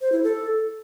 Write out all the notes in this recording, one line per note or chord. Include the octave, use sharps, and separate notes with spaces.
C5
E4
A4